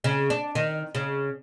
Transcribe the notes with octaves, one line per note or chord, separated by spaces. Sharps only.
C#3
D4
D#3
C#3